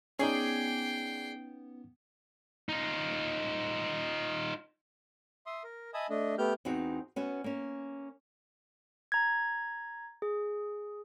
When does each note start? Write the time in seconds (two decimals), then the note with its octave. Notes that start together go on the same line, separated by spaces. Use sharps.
0.19 B3 C#4 D#4 G#4 D5 G5 C7
2.69 D#4 F4
5.46 E5 C6 D#6
5.64 A#4
5.94 D#5 E5 G#5 A5 B5 D#6
6.10 A3 D4 D#5
6.38 A3 B3 G4 F6 G6
6.65 E2 B3 C4 D#4 F#4
7.16 B3 C#4 F#4
7.44 A#3 C#4
9.12 A#5 G#6
10.22 G#4